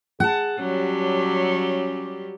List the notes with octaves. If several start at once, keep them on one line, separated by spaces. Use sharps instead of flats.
G#4 F#5 A5
F#3 G3 C#4 G4